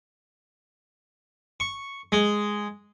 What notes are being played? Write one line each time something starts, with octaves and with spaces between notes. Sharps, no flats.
C#6
G#3